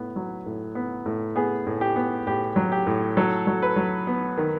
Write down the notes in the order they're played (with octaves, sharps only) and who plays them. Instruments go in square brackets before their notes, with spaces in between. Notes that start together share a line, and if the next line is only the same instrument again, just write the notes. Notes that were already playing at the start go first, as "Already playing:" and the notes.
Already playing: [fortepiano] A2 B3
F#3
A2
B3
A2
B3 G#4
A2
G4
B3
A2 G4
F#3
G4
A2
F#3 A4
F#3
B4
F#3
B3
D#3